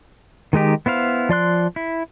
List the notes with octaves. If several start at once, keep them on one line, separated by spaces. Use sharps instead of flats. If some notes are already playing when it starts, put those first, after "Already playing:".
D#3 G#3 D#4 G4
B3 E4 C5 F5
F3 D5 C6 F#6
E4